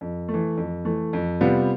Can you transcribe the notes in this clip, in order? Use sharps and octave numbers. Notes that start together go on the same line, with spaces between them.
F2
A3
E3
F2
E3 A3
F2
C3 G3 B3 F4